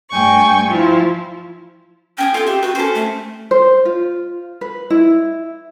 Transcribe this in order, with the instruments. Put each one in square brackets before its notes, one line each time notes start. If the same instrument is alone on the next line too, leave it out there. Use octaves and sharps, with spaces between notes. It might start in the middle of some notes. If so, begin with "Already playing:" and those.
[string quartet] G2 A3 G5 G#5 C#6
F3 E4 F4
[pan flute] C#4 [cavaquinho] G5 G#5 D#6
[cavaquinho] F4 G5 [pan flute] A4
[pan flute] G4 [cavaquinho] E5 G5
[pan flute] F#4 [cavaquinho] B4 G5
[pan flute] C#4 [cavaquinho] A4 C5
[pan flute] A3
[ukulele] C5
F4
B4
E4